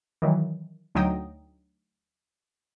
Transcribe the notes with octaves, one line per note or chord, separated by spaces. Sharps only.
D#3 E3 F#3
D2 F#3 D#4 G5 D#6 A#6